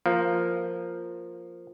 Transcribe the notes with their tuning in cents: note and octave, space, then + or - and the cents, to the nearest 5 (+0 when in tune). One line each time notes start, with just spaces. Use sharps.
F3 +0 A#3 +0